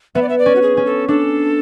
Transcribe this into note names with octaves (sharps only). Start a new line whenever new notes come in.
B3 E5
D5
E5
D5
C#4
F#4
G#4
C#4
A4
D4 A4